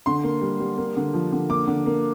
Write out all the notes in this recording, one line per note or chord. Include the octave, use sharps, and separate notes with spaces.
D3 C6
A#3
G3
G3
A#3
D3
F3
D3
A#3 D6
D3
A#3